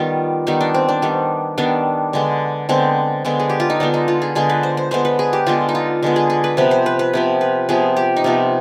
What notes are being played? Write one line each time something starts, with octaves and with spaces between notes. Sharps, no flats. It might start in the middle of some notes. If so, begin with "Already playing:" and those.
Already playing: D#3 G3 B3 F4
D#3 G3 B3 D#4
D4
C4
D4
D#3 G3 B3
D#3 G3 B3 D4
D3 G#3 B3
D3 G#3 B3 C4
D3 G#3 B3
G#4
G4
F4
D#4
D3 G#3 B3 D4
D#4
F4
G#4
D3 G#3 B3 G#4
B4
C5
C5
D3 G#3 B3 C5
B4
G#4
G4
D3 G#3 B3 F4
D#4
F4
D3 G#3 B3
G#4
G#4
B4
C3 F3 B3 B4
C5
B4
B4
C3 F3 B3
B4
C3 F3 B3 G#4
G4
D#4
C3 F3 B3 F4